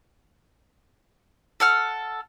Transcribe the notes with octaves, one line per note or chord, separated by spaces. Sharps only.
A4 F#5 F6